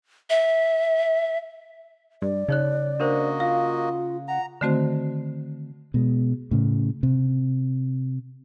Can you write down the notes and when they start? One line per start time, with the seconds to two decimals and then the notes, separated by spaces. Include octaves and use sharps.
0.30 E5
2.22 G2 D5
2.49 C#3 D#4 C#5 F#6
3.00 A#3 D4 F#4 A#4 C5 D#5
3.40 F4 F5
4.28 F#5 A#5
4.61 D3 D#3 A3 C4 F#4 C5
5.94 B2 G#3
6.51 A2 C#3
7.03 C3